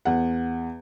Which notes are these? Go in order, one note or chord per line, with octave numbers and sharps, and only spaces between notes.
E2 F#5